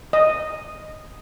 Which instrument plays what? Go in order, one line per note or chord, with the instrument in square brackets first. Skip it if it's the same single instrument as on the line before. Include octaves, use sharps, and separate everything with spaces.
[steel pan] D#5